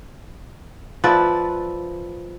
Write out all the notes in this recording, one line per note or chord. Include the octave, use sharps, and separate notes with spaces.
F3 B4 D5 E5